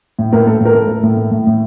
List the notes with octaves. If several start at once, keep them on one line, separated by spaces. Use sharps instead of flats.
A2
A2 A#4
A2 A4
A2 A#4
A2 A4
A2
A2
A2
A2
A2